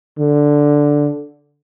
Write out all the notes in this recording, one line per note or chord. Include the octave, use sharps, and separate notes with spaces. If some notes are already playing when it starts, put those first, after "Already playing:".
D3